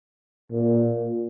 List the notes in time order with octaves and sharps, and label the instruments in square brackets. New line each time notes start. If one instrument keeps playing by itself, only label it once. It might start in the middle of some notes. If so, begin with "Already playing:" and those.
[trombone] A#2